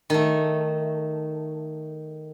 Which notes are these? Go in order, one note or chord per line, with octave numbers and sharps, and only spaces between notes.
D#3 A3